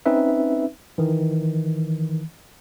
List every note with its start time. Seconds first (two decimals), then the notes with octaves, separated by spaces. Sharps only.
0.06 C4 C#4 D#4 B4 E5
0.98 D#3 E3